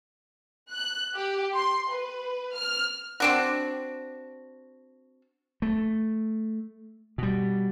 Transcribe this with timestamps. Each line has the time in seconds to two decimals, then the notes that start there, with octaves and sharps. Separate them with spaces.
0.71 F#6
1.15 G4
1.55 C6
1.90 B4
2.54 F6
3.20 C4 D4 F#4
5.62 A3
7.18 B2 G3